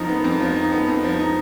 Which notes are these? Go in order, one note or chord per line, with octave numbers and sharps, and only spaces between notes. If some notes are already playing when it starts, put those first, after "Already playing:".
Already playing: F2 F3 D#4
B3
F2
F3
D#4
B3
F2
F3
D#4